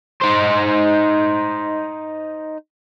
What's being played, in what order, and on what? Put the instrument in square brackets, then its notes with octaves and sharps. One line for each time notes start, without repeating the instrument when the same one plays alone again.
[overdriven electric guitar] D#4 C5